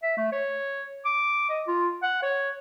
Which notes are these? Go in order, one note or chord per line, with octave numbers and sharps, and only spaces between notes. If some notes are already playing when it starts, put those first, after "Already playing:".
E5
A3
C#5
D6
D#5
F4
F#5
C#5